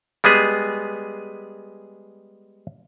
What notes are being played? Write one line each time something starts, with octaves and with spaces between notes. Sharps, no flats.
G3 G#3 B3 G#4